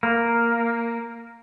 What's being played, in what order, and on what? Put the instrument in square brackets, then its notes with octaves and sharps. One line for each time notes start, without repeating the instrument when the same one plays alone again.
[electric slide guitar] A#3